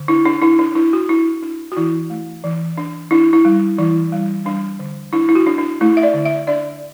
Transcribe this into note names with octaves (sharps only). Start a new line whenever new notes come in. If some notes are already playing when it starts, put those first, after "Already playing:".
Already playing: D3
D4 E4
D4
D4 E4
D4
D4 E4
F#4
D4 E4
D4
F#4
E3 E4
A3
E3
D4
D4 E4
E4
G3
E3 E4
G3
G3 D4
D3
D4 E4
E4
F#4
D4
D4
A3 E4
E5
D5
D3
E5
D4 D5